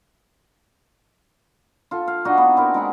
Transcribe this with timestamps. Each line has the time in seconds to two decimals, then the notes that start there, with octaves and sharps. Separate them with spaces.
1.91 F4 A4
2.08 F5
2.25 D4 D#4 F#4 D#5
2.38 B3
2.56 C4 E4 A#4
2.74 G#3 E4 F#5